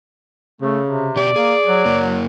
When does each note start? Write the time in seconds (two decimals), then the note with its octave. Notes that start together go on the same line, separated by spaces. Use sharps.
0.61 C#3 A3
0.88 C3
1.16 B2 G4 D5
1.36 A#3 G#4
1.67 F#3
1.85 F#2 A#3